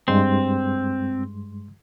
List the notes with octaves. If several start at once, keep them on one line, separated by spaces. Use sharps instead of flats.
G2 G#3 C4 C6